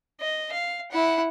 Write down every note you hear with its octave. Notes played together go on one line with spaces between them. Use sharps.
D#5
F5
E4 F#5